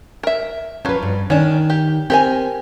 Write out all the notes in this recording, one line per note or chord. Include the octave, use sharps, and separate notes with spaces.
A#4 E5
F3 F#3 C#4 B4
G2
D#3 C#4 D4
G4
C4 G4 A#4 G#5